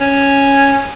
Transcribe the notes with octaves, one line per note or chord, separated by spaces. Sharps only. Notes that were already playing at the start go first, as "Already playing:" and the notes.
C#4